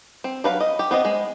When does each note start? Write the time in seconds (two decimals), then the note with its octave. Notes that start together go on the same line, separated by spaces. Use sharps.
0.24 C4
0.44 F#3 B4 F5
0.60 D#5
0.79 G4
0.91 B3 C4 D#5
1.05 G#3